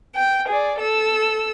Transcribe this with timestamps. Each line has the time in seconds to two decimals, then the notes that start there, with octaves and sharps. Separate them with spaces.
0.15 G5
0.48 G#4 D5
0.78 A4 E6